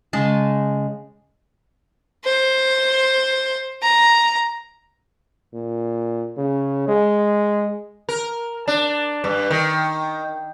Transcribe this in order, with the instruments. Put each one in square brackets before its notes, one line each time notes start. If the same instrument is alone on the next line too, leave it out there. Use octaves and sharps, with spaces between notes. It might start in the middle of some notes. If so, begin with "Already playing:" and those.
[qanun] C#3 G#3 A5
[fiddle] C5
A#5
[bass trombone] A#2
C#3
G#3
[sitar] A#4
D4
G2
D#3